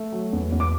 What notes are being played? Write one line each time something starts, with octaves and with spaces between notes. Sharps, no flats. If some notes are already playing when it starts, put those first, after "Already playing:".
Already playing: A3
F#3
E2
E2
D6